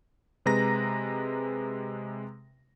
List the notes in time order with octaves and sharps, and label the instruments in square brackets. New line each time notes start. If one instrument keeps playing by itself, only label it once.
[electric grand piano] C3 G#3 B4 A#5 A#6